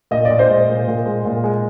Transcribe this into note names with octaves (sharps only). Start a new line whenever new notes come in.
A#2 D#5
D5
A#2
C5 D#5
G#3
A#2
A#2
G#3
A#2
G#3